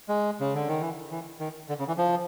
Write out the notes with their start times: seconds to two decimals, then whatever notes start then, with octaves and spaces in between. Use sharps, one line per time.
0.09 G#3
0.40 C#3
0.55 D3
0.68 D#3
0.81 E3
1.11 E3
1.40 D#3
1.69 D3
1.79 C#3
1.88 E3
1.98 F3